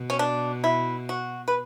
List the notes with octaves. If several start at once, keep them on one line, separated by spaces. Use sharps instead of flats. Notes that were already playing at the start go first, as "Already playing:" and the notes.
Already playing: B2
C#4
D4
E4
F#4
B4